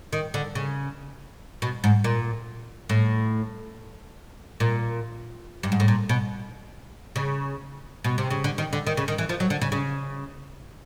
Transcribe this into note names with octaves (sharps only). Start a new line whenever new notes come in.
D#3
D3
C#3
B2
G#2
A#2
A2
A#2
G2
G#2
A2
A#2
B2
C#3
B2
C3
C#3
D3
D#3
D3
D#3
C#3
D#3
E3
F3
F#3
D3
C#3
C#3